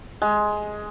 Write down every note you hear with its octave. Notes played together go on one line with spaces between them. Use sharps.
G#3